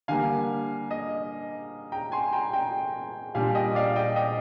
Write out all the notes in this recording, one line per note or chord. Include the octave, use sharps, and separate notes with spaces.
D3 G3 A#3 F5 G#5
D#5
G5 A#5
G#5 C6
G5 A#5
G5 A#5
A#2 G3 D4 F5 G#5
D#5 G5
D5 F5
D#5 G5
D#5 G5